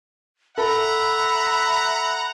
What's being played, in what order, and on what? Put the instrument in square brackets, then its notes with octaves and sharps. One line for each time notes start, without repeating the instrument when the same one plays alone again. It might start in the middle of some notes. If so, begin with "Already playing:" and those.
[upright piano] A4 [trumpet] E5 [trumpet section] F#5 A#5 [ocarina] B5